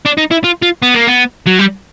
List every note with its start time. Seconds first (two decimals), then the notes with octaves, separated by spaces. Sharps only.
0.06 D4
0.18 D#4
0.31 E4
0.44 F4
0.62 F4
0.82 B3
0.94 A#3
1.07 B3
1.47 F#3
1.59 G3